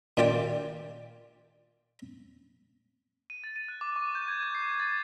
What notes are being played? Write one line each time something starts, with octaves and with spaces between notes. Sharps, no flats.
A#2 D#3 F4 G4 D5
D#7
A6
D#7
F#6
D6
C#6
G6
G#6
G6
C7
A6